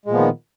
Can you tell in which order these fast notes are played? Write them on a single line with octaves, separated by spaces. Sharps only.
G#3 A#2 F3 B3 D#3